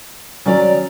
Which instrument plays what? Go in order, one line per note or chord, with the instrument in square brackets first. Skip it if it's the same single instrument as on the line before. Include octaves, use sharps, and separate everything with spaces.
[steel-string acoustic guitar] D#3 D5 A#5 [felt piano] F#3 C#4